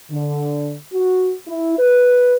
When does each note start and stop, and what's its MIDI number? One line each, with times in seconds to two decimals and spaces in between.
0.11 0.74 50
0.93 1.34 66
1.48 1.77 64
1.79 2.36 71